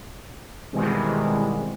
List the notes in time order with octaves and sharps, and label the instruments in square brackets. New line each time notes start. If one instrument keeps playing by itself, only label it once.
[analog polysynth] B2 D#3 E3 G3 G#3 C4